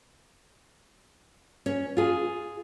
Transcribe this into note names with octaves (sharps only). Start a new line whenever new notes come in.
C#4
F4 G#4